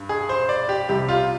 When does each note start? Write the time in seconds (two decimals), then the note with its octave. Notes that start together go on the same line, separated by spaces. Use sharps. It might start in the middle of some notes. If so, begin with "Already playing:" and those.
Already playing: G2
0.09 G#4
0.29 C5
0.49 D5
0.69 G4
0.88 C2 C3 G3 G4
1.09 F4